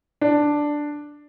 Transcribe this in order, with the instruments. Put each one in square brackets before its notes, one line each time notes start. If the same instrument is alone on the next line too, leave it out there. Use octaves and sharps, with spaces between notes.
[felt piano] D4